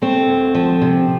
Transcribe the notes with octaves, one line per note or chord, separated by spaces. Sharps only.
A3 C4
D2
F3
C3